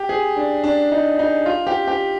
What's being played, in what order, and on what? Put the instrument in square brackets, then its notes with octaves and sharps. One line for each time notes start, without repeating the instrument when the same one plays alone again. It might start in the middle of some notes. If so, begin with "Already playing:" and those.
Already playing: [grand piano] G4
G#4
D4
D4
D#4
D#4
F4
G4
G4